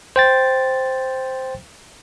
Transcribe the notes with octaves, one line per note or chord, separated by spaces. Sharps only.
C5 G5 A6